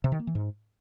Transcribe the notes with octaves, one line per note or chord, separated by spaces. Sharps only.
C3
D#3
A#3
E3
G#2